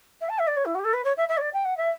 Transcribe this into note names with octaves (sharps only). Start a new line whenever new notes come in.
E5
A5
E5
D5
C#5
E4
F#4
G4
A4
B4
C#5
E5
E5
C#5
D5
G5
F#5
E5